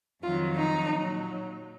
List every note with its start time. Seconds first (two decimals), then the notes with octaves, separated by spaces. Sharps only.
0.22 F2 D#3 F#3 F4
0.55 D#4
0.90 A#2 F#3